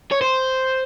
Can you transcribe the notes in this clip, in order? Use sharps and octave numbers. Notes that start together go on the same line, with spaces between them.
C#5
C5